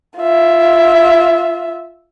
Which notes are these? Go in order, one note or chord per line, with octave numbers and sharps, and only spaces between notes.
F4 E5